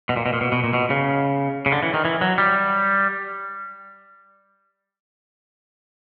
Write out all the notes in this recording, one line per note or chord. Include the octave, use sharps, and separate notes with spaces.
B2
A#2
B2
A#2
B2
B2
A#2
B2
C#3
C#3
D3
E3
D#3
E3
F#3
G3